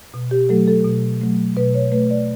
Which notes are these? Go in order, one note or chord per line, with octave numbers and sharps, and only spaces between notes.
B2
G4
F#3 A3 A4
A4
B2
F#3 A3
B2 B4
C#5
A3 B4
D5